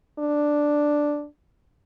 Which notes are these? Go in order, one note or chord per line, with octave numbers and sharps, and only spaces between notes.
D4